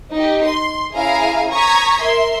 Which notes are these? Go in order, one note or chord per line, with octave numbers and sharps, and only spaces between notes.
D#4 G4
C6
C#4 E4 G#4 F5 G#5 A#5
A#5 C#6 D#6 G#6 B6
A#4 E5 C6